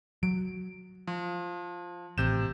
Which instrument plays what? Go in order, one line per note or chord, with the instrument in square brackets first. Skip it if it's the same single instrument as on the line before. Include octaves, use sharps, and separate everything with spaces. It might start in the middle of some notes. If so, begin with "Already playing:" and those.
[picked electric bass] F#3 [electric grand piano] D7
[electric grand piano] F3
[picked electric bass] A1 [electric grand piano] C3 G6 E7